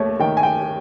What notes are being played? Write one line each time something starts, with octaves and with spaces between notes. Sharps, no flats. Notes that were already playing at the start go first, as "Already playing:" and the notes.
Already playing: D#2 A3 C#5
D#3 G5
G#5
G5